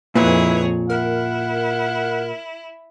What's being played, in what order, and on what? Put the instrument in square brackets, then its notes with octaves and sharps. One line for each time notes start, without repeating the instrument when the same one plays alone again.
[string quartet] F2 G#4 C#5 [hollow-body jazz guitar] A#2 [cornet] E4 [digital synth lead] B4
[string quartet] E4 [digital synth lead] A#4 [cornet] F#5